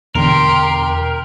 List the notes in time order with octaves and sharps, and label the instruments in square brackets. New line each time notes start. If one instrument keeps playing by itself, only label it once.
[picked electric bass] E2 B2 D3 [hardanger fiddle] G4 C6 [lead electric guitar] A#4